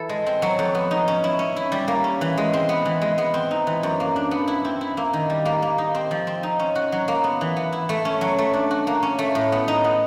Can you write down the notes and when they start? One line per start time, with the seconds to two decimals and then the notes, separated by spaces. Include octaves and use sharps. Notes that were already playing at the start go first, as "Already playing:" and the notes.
Already playing: E3 E4 A4
0.09 G#3
0.26 C4
0.42 F#3
0.59 F2
0.75 B3
0.91 D#4
1.08 C#4
1.24 E4
1.39 C#4
1.56 E4
1.72 G3
1.88 A#3
2.04 C#4
2.21 E3
2.38 G#3
2.53 C4
2.69 B3
2.85 E3
3.02 G#3
3.18 B3
3.34 C4
3.51 D#4
3.67 E3
3.83 F#2
4.00 A#3
4.16 D4
4.31 B3
4.48 E4
4.65 C4
4.81 E4
4.97 A#3
5.13 D#3
5.30 G3
5.45 A#3
5.62 A#3
5.78 D#4
5.95 C4
6.11 F3
6.27 C4
6.43 D#4
6.59 C#4
6.75 F#4
6.92 F#3
7.08 A#3
7.24 B3
7.41 E3
7.56 B3
7.72 E4
7.89 A3
8.05 C#4
8.21 F#3
8.38 A3
8.54 D4
8.71 F#4
8.87 A#3
9.03 C#4
9.19 A3
9.35 A2
9.52 B3
9.68 D#4
9.84 B3